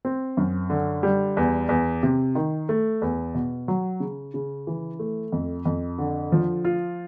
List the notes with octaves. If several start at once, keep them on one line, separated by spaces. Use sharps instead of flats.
C4
F#2
D3
G3
E2
E2
C3
D#3
A3
E2
B2
F#3
C#3
C#3
E3
A3
F2
F2
D3
F3
F4